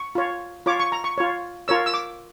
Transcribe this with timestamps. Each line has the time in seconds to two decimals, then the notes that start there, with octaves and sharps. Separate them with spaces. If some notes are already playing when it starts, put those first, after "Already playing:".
Already playing: C#6
0.15 F4 C#5
0.66 F4 C#5 D6
0.79 C#6
0.92 A#5
1.04 C#6
1.18 F4 C#5
1.68 F4 A#4 C#5 E6
1.86 E6
1.94 D6